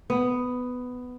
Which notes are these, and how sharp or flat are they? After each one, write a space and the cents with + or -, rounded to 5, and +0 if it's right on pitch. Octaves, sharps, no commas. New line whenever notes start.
B3 +10